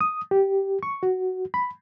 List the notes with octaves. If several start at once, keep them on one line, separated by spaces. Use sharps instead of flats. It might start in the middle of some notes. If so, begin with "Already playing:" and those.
D#6
G4
C#6
F#4
B5